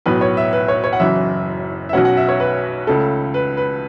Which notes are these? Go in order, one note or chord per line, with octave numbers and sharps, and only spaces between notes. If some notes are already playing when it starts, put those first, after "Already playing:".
B1 A2 F#3 B3 B4
C#5
E5
B4
C#5
C#5
F#5
F#1 F#2 E3 E5
E5
B1 B2 F#3 C#4 F#5
F#5
E5
C#5
B4
C#2 C#3 A3 A4
B4
B4